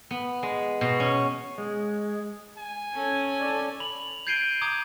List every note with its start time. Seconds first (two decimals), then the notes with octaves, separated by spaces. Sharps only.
0.11 B3
0.43 G#3
0.81 B2
1.00 C#4
1.58 G#3
2.58 G#5
2.95 C#4 A4
3.40 A4 D5
3.80 B5 F7 F#7
4.27 G6 G#6 C7 D7 D#7 G7
4.61 A#5 D6 D#6 G6 G#6